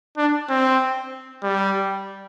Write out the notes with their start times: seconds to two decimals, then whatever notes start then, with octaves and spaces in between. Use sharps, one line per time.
0.17 D4
0.49 C4
1.43 G3